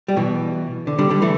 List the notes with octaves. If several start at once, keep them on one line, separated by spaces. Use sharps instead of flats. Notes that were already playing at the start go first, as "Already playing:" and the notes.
G3
B2 E3
D3
D3 G3
D3 G3
E3 A3